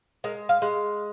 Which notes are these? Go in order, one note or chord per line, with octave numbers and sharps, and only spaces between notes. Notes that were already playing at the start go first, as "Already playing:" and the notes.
G#3 A#4
F5
G#3